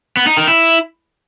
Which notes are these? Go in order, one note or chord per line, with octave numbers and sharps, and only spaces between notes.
B3
D#4
D#3
E4